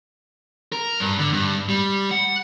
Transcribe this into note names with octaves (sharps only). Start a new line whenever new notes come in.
A#4
G2
D3
G2
G3
F#5